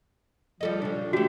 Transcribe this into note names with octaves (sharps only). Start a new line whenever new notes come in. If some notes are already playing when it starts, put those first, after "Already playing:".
F3 G3 A4 D#5
C#3 G3 D4
E3 A3 F#4 G4